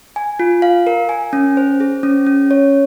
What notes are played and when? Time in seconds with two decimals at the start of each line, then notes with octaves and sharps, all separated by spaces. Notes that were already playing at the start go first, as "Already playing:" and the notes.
0.16 G#5
0.40 F4
0.62 F5
0.87 A#4
1.09 G#5
1.33 C#4
1.57 C5
1.80 G#4
2.03 C#4
2.27 C#4
2.51 C#5